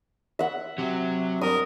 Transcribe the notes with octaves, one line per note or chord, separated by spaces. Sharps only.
E5 F#5
C3 F#3
G2 A#4 D#6